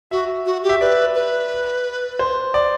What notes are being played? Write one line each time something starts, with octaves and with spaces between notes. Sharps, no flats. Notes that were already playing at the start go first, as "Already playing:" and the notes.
F#4 E5
F#4
G4
E5
B4 D5
B4
C5
D5